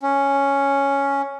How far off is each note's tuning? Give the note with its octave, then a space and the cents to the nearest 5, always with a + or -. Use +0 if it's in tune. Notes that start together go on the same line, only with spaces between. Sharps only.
C#4 +0